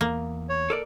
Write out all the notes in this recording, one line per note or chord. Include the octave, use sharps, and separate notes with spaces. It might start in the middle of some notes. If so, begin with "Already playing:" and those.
E2 A#3
C#5
A4 A#4 D5